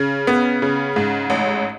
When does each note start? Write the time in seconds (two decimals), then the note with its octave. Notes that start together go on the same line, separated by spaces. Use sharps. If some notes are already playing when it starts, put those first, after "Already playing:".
Already playing: C#3
0.27 B3
0.62 C#3
0.96 G#2
1.30 A1